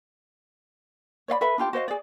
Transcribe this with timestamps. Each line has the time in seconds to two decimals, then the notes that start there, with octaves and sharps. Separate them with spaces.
1.28 C#5 D5 F5 B5
1.41 A4 B4 E5 B5
1.58 D4 F4 G4 G5
1.73 F#4 C5 D#5 F5
1.88 G#4 D5